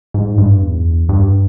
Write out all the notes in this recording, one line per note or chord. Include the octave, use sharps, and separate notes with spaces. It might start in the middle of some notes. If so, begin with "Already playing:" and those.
G#2
G2
E2
G2